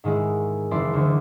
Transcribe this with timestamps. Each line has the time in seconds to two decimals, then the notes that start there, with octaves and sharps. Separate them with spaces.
0.04 G#2 D#3 G#3 E4
0.71 F#1 E3 E4 D5 C6
0.93 D2 D3